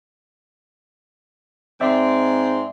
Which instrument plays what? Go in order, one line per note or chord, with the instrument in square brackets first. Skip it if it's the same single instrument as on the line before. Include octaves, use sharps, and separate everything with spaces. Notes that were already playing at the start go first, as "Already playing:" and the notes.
[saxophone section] G#2 C4 [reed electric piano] D5 E5